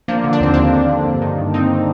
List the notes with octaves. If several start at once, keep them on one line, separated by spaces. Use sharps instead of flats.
F3 A#3 D4
D3
D4
D#2 C4
D#2 A#3 D4
F3
D3
G2
D#3
G2
D#3 C4 D#4